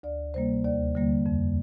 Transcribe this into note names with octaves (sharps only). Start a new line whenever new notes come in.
D2 D5
C3 G3 A#3 C5
D#2 D5
D3 G3 A#3
F2